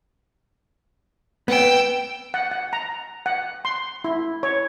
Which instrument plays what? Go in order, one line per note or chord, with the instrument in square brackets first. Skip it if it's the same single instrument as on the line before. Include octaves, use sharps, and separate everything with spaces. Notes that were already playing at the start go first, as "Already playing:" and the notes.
[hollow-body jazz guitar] B3 [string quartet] G5 E6
[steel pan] F#5
F#5
A#5
F#5
C6
E4
C#5